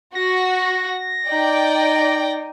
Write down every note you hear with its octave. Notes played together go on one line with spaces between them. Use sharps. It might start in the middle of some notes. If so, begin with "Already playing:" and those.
F#4 A#6
D#4 D5 G5